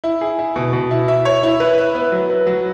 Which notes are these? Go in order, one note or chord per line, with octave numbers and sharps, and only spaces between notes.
E4
G#4
E4
B2
B2
E4
E5
C#5
E4
B4
E5
B3
F#3
B4
F#3